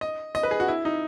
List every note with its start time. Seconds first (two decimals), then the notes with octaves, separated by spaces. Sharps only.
0.01 D#5
0.35 D#5
0.43 B4
0.51 G#4
0.60 F#4
0.68 E4
0.85 D#4